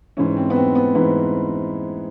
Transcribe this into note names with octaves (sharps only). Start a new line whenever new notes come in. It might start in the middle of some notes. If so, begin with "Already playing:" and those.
G#2 E3 C#4
C4
B3
C4
B3
G#2 E3 B3